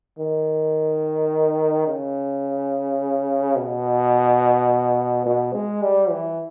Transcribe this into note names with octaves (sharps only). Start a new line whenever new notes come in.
D#3
C#3
B2
B2
G#3
G3
E3